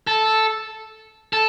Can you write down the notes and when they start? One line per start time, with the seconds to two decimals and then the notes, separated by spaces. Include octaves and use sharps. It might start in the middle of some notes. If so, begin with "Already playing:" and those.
0.07 A4
1.33 A4